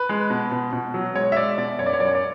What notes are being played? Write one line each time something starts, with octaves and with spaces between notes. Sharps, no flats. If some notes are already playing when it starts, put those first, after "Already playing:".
Already playing: B4
G#3
B2
B2
B2
F#3
G#3 C#5
E5
G#3 D5
B2 D5
F#2 C#5
D5
C#5
F#2 D5
C#5
D5